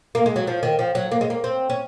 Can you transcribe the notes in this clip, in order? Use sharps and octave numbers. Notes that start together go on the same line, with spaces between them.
A#3
G#3
F#3
F3
D#3
F3
F#3
A#3
G#3
A#3
C4
C#4